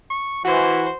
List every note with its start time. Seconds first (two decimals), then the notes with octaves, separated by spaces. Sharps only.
0.10 C#6
0.45 E3 F#4 C5